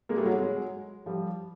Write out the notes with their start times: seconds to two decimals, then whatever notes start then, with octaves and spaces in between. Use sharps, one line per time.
0.09 G#3 A#3
0.17 G3 A3
0.26 F#3 G#3
0.41 F#3 G#3
1.06 F3 G3